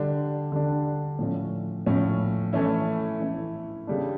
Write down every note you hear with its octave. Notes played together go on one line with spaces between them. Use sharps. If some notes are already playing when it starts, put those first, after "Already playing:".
Already playing: D3 G3 D4
D3 G3 D4
A2 F3 C#4
A2 F3 C#4
E3 A3 C#4 E4
E3 A3 C#4 E4
C#3 G3 D4